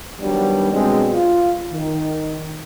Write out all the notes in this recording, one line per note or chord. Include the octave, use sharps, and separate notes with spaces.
D#3 F#3 G3 B3 D4
B2 F#3 G#3 C4 D4
F4
D#3